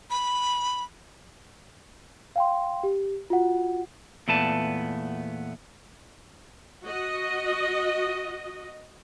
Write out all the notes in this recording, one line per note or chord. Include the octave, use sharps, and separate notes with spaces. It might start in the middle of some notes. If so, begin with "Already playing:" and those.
B5
F5 G5 C6
G4
F4 F#4 F#5
E2 A#2 A3 B3 B4 A5
F#4 D#5